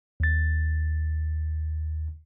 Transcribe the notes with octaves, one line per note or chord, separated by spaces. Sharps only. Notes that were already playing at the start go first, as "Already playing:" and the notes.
D#2 A6